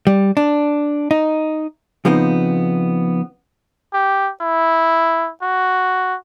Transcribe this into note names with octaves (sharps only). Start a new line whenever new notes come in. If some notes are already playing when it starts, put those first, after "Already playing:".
G3
D4
D#4
C#3 F3 B3 C4 D#4
G4
E4
F#4